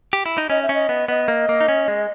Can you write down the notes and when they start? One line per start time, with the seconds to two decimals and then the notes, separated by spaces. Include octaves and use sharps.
0.13 G4
0.26 E4
0.38 D#4
0.50 C#4 D#5
0.62 E5
0.69 C#4 D#5
0.89 B3
1.08 B3 D#5
1.28 A#3
1.49 A#3
1.61 D#4
1.68 C#4
1.88 G#3